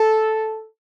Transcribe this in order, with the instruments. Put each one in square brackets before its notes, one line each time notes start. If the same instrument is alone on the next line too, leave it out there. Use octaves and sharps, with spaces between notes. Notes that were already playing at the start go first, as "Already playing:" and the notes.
Already playing: [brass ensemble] A4